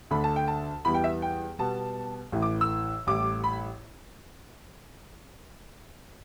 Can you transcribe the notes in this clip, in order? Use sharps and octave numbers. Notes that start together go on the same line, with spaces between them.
D2 D3 A3 D4 A4 B5
A5
G5
A5
E2 E3 G3 B3 B5
G5
E5
G5
B2 G3 B3 A5
A1 A2 E3
D6
E6
A1 A2 G3 D6
B5